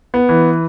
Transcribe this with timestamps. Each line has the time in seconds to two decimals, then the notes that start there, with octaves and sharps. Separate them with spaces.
0.14 B3
0.29 E3